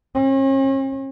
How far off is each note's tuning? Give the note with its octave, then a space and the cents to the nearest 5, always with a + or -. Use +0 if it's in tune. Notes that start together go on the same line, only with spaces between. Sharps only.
C#4 -45